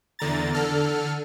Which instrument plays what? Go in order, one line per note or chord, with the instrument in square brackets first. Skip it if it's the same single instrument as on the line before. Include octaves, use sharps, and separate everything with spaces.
[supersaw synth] E2 D3 A#5 A6
D3 A4 F6